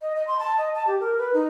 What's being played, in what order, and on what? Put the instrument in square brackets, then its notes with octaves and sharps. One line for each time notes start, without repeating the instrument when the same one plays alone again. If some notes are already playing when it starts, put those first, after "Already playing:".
[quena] D#5
D#5
C6
A5
D#5
A5
G4
A#4
B4
D#4